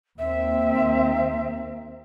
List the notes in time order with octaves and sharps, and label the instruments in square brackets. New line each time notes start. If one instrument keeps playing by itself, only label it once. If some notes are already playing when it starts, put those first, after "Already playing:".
[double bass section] D#2 A#3 C4 [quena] E5